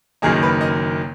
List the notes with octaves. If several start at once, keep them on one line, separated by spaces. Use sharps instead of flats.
F#1 F#2 D#3 A#3 D#4 G#4
B4
D#5